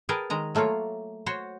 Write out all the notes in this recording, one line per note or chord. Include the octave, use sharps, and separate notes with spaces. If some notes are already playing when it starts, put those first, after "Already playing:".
G#4 A#4 B4 G5 A5
D#3 G#3 A#5
F#3 A3 A#3 F4 C#5
F#4 C5 C#5